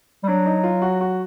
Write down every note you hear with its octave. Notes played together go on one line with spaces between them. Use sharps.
G3
F#3 D4
D#4
F4
F#4
F#4